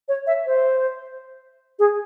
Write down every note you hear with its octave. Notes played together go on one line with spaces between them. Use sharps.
C#5
E5
C5
G#4